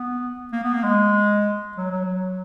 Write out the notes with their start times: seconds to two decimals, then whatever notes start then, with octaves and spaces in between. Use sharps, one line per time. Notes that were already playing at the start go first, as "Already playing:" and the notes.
Already playing: B3
0.53 A#3
0.63 B3
0.74 A#3
0.83 G#3
1.77 F#3
1.91 F#3
2.05 F#3